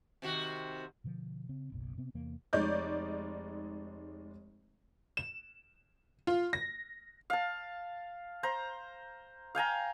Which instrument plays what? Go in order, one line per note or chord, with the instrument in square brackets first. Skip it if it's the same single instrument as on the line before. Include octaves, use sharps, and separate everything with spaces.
[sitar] C3 D#3 F#4
[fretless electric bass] B2 D3 D#3 F3
C#3 C4
F#1 B1 B2
C3 B3 C4
E2 C3 E3 A#3
[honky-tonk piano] F1 G#3 D#4 C#5 D5 G6
E7
F4
A#6
[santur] F5 A5
C5 A#5
F5 G5 G#5 A#5